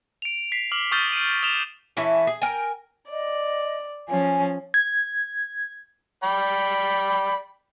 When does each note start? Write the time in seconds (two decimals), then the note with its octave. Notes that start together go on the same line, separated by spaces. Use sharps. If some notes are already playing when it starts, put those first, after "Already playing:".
0.22 D7 F7
0.52 B6 C7
0.72 D6 F6 F#7
0.92 C#6 D#6 F6 G6 A6 G7
1.13 D7 D#7
1.43 D#6 F6 A6 E7 F7 G7
1.97 E3 C#4 E4 A4
2.27 G#4
2.42 A#4 G5 G#5
3.11 D5 D#5
4.08 F3 C#4 G#5
4.74 G#6
6.23 D5 G5 B5